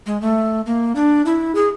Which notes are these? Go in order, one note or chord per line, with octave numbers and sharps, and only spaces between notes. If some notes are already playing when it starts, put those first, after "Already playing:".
G#3
A3
A#3
D4
E4
G#4